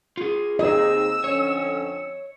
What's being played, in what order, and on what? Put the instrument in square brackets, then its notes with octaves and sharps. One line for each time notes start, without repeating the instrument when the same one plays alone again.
[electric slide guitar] F4 G#4
[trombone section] D#2 C4 D#4 [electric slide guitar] G#4 [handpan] D#5 [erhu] E6
[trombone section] F2 D3 C#4 [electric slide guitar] C#5